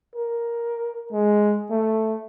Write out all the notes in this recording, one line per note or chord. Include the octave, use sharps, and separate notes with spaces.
A#4
G#3
A3